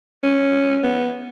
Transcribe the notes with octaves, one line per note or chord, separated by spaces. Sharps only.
C#4
B3